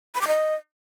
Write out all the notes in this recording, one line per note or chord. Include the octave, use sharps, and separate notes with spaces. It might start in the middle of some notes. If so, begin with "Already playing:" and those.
B5
D6
D#5